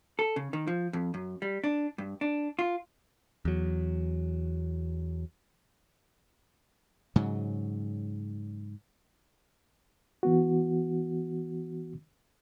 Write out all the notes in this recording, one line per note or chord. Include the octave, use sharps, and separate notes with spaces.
A4
C#3
D#3
F3
F2
F#2
G3
D4
G2
D4
F4
E2 F#3
G#2 C#3 F#3
E3 B3 F#4